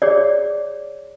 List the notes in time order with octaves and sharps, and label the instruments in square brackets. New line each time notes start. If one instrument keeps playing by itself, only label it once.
[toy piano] G#4 C#5 D5